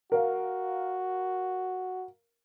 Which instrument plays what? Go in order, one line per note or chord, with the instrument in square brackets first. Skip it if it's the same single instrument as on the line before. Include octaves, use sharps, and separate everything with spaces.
[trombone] F#4 [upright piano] A#4 F5